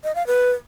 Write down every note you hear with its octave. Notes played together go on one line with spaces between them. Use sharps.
D#5
F5
B4